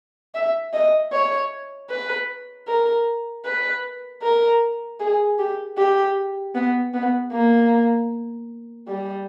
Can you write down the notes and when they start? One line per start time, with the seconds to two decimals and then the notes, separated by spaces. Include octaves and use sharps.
0.35 E5
0.73 D#5
1.12 C#5
1.90 B4
2.67 A#4
3.45 B4
4.22 A#4
5.00 G#4
5.39 G4
5.78 G4
6.55 B3
6.94 B3
7.32 A#3
8.88 G3